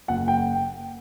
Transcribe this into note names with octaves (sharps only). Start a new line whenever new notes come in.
F#1 F#5
G5